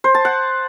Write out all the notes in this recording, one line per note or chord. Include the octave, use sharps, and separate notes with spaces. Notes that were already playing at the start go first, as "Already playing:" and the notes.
C5
A5
F#5